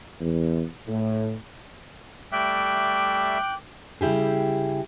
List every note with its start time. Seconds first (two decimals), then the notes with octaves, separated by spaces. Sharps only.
0.20 E2
0.87 A2
2.32 G3 A3 E5 G5 D6 F#6
4.01 C#3 G3 E4 G4 G#4